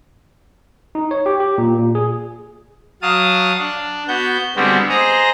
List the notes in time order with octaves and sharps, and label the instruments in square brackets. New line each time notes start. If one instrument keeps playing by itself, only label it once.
[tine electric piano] D#4
C#5
G4
G4
A#2
A#2
G#4
[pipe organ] F#3 F5 A5 D#6
D4
B3 F#4 G6
D3 G3 G#3 B3 C4 F#4
G#4 C5 D#5 A#5